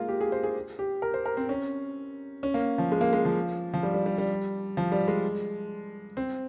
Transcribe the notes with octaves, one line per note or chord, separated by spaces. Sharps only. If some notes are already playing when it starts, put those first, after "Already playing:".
Already playing: G#3 A#3 F4
G4
G#4
C5
G#4
G4
A#4
C5
A#4
C4
C#4
C#4
A#3
F3
G#3
A#3
G#3
F3
F3
G3
G3
G3
G3
F3
G3
G#3
C4